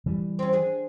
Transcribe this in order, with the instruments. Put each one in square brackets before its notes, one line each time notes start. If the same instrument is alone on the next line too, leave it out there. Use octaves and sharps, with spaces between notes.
[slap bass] E3 G3
[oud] C4 C#4
D4 G#4